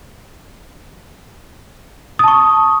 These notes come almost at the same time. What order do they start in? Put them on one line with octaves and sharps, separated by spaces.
D#6 A5 C#6